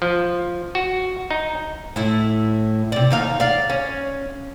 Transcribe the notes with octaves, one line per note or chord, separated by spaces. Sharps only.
F3
F#4
D#4
A2 E4
C3 D5
D#2 D#4 F5
D5 F5
C#4